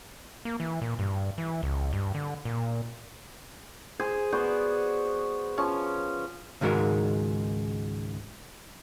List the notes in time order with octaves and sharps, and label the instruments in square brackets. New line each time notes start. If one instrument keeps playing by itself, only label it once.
[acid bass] A#3
E3
A#2
G2
E3
C#2
G2
D3
A#2
[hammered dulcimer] G#4 C5 G#5
B3 F#4 C5 D5
F3 C#4
[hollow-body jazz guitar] C#2 G#2 D#3 G#3 F#4 A#4